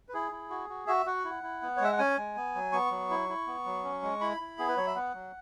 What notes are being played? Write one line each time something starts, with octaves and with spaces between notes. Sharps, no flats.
B4
E4 G#4
E4
F#4
F#4
F#4 E5
F#4 F#5
E4
E4
B3
C#5
G#3 E5
F#5
C#4 G#5
G#3
B3
F#3
B3 C#6
F#3
E4
E4
B3
F#3
C#4
G#3
E4 B5
E4
B3 G#4
B4
F#3 C#5
E5
B3 F#5
F#3